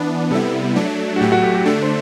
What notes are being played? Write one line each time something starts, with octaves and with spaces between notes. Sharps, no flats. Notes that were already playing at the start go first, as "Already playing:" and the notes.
Already playing: E3 B3 D4
C3 G3 B3 E4 A4
F#3 A3 D4
F#4
A2 F#3 A3 G4
F#4
G4
G4
D3 A3 D4 A4
C5